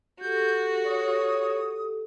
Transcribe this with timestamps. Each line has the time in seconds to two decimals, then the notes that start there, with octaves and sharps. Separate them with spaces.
0.21 F#4 G4 A4 G6
0.86 C#5 D#6